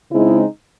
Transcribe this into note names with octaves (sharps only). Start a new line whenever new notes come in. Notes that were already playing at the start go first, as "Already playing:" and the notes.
C#3 G#3 C4 D#4 E4